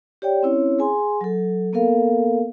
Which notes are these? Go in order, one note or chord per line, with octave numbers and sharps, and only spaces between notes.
G4 C#5 D5 G5
C4 C#4 E4 C#5
G#4 G#5 C6
F#3 A4
A#3 B3 A4 A#4 F5